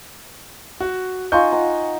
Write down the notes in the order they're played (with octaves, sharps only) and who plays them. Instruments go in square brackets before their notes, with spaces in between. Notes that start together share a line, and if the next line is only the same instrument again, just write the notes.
[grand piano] F#4
[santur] D#4 F4 [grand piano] G#5 C#6 G6
[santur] D#4 F#5